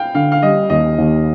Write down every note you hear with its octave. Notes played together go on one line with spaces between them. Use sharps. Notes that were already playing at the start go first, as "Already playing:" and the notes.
Already playing: F5 G5
D3 F5
F5
G3 D#5
D#2 D#5
D#2